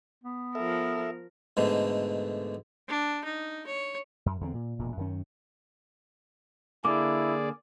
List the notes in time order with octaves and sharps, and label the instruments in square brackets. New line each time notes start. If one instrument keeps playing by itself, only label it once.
[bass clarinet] B3
[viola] F3 A#4 [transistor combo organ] A4 E5
[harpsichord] G#2 B2 D3 A3
[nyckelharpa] D4
D#4
C#5
[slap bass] F#2
E2 D3 C4
A#2
E1 A#2
F#2 D#3 C#4
[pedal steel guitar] D3 A#3 [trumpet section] E4 [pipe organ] G#4 D5 [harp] D6